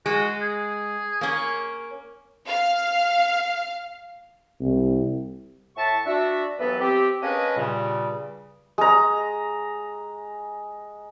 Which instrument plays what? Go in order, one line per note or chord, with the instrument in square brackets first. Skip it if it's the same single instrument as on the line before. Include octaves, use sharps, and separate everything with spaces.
[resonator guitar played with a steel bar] G#3 [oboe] F#4
[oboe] G#4
[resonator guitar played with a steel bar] A#3 C#4
[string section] F5
[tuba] C2
[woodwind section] A2 E5 A5 C#6
D4 F#4 E5
D#2 E3 F#3 B3 A4 B4
C4 G4
A#3 C#4 D4 G#4 B4 D#5
G2 A#2 C#3 G3
[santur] G#3 A#5